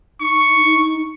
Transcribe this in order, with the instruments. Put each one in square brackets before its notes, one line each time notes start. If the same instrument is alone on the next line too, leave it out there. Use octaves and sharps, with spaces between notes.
[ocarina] D#4 [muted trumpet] C#6